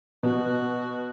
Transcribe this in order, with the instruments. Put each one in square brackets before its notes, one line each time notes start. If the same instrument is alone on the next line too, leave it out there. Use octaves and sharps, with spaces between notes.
[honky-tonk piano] B2 [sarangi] F#4